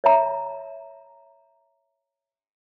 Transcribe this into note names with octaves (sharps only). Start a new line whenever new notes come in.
C#5 E5 A#5